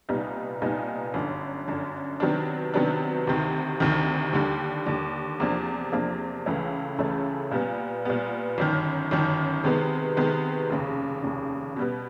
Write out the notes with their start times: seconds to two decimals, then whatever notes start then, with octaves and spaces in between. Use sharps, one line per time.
0.09 C2 A#2 G3 B3 D#4
0.62 C2 A#2 G3 B3 D#4
1.14 G1 F#2 D3
1.68 G1 F#2 D3
2.20 C3 D#3 F#3 B3 D4
2.74 C3 D#3 F#3 B3 D4
3.27 D2 C3 D#3
3.80 D2 C3 D#3
4.33 D#2 D3 G3
4.86 D#2 D3 G3
5.40 E2 C3 F3 A#3 D4
5.92 E2 C3 F3 A#3 D4
6.46 C#2 C#3 E3 A3 C#4
6.98 C#2 C#3 E3 A3 C#4
7.51 A#2 G3 B3
8.05 A#2 G3 B3
8.58 G1 F#2 D#3
9.11 G1 F#2 D#3
9.64 C3 D#3 G#3 B3
10.17 C3 D#3 G#3 B3
10.70 F1 D#2 C#3
11.23 F1 D#2 C#3
11.76 B2 G3 B3